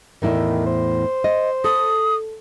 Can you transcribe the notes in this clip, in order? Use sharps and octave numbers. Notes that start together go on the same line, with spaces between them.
E2 A2 D#3 E4
C5
D#5
A4 D#6